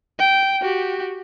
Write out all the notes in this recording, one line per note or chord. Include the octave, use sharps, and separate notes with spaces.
G5
F#4 G4